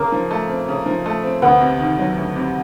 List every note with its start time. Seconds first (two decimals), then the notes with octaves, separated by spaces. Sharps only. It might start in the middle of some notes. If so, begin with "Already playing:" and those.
Already playing: C#3 A#3
0.12 F3
0.31 A3
0.49 C4
0.68 C#3
0.86 F3
1.06 A3
1.23 C4
1.42 D2 B3
1.61 C3
1.79 D#3
1.99 F#3
2.17 D2
2.36 C3